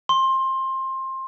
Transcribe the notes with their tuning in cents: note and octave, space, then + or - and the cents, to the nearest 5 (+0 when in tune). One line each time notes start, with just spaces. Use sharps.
C6 +20